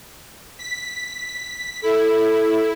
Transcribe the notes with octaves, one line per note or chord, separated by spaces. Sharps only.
B6
E4 A4